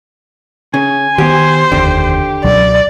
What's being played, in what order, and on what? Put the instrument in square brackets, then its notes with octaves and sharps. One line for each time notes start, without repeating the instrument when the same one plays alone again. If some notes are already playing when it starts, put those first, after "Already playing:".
[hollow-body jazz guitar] C#3 [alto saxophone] G#5
[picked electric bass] D#3 B3 [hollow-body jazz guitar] G4 [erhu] C5
[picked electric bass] F1 D#2 [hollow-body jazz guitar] D3 [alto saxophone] G4
[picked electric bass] C#2 B2 F#3 [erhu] D5